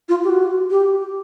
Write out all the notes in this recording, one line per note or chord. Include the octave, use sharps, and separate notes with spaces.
F4
G4
F#4
G4